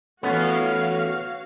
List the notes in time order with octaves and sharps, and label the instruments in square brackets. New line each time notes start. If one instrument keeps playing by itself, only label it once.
[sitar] E2 C#4 [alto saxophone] A3 [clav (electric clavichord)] B3 [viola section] F#4 C#5 F5